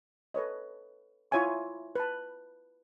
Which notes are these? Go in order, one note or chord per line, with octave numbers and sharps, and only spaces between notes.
A4 B4 C#5 D#5
E4 F4 C#5 E5 G#5 C#6
B4 A5